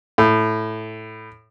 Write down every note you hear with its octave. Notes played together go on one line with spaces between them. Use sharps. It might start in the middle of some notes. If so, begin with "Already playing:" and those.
A2